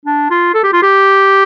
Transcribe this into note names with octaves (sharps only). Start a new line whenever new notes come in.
D4
F4
A4
G4
F4
G4